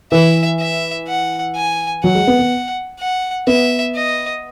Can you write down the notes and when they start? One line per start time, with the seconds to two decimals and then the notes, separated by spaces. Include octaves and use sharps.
0.12 E3 E5
0.59 E5
1.07 F#5
1.55 G#5
2.04 F#3 F#5
2.15 G#3
2.27 B3
2.39 B3
2.99 F#5
3.47 B3 E5
3.95 D#5